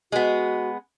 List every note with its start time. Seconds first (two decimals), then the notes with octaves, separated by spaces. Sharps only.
0.12 G#3 B3 F#4